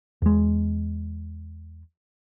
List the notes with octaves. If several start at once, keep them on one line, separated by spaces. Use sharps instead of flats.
E2 G#3